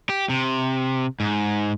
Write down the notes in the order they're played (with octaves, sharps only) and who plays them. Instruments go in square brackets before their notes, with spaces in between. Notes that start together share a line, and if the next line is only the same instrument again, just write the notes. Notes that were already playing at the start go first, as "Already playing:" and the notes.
[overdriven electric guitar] G4
C3
G#2